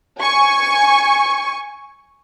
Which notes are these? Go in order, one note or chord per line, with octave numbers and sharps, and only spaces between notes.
G#5 C#6